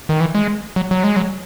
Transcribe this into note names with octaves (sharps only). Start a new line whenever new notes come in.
D#3
E3
G#3
F#3
F#3
G#3
F#3